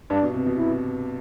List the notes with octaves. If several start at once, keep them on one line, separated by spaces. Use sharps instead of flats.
G2 D4
B2
C3
B2
E4